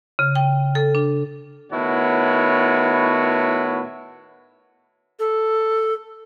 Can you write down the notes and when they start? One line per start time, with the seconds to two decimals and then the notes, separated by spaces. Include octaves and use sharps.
0.19 C#3
0.35 G5
0.75 A4
0.95 D4
1.72 A2 D#3 B3 E4 F#4 C#5
5.19 A4